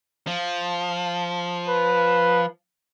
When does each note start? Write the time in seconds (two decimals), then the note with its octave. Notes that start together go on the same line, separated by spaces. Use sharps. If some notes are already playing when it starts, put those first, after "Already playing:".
0.27 F3
1.68 B4